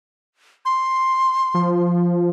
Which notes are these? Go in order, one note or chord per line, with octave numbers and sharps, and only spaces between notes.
C6
F3